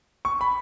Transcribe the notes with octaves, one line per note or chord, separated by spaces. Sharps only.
C#6
B5